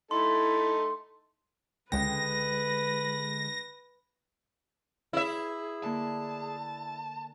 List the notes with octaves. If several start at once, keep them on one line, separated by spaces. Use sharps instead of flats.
A3 D#4 E4 A4 C6
C#2 D3 G#3 B4 G5 A#6
E4 G#4 E5
D3 A#3 A5